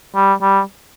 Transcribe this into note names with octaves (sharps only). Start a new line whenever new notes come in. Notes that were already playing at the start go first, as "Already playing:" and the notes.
G3
G3